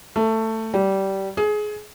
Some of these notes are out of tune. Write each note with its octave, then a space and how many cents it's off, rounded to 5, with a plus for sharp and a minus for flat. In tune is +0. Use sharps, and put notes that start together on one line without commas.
A3 +15
G3 -20
G#4 +20